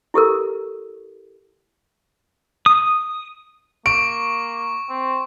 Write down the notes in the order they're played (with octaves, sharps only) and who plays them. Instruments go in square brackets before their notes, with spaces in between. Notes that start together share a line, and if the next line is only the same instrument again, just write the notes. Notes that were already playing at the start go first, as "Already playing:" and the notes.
[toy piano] E4 G4 A4 A#4
[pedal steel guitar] D#6
[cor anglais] A#3 [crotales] C#6 [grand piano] D7
[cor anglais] C4